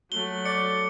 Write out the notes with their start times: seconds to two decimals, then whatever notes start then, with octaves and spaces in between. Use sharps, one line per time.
0.12 F#3 A3 G7
0.46 D5 C#7